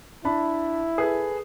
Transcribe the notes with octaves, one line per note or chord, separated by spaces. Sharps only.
D4 E4 A5 B5
G#4 A4 B4